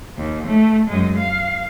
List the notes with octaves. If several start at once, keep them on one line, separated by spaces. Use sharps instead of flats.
D#2
A3
F#2 G#3
F5